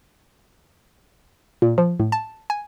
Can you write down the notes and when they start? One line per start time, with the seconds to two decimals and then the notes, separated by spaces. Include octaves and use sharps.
1.62 A#2
1.78 F3
2.00 A2
2.12 A5
2.50 G#5